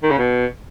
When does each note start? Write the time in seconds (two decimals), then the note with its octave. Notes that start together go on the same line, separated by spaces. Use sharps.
0.03 D#3
0.10 C#3
0.18 B2